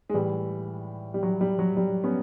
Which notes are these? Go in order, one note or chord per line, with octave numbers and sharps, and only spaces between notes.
G#3
A2 E3 G3
G3
F#3
G3
F#3
G3
B3 C#4